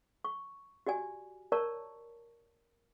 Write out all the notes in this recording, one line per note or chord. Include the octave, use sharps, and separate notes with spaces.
C#6
F#4 G4 D5 G#5
A#4 C#5 D5 A5 A#5 C#6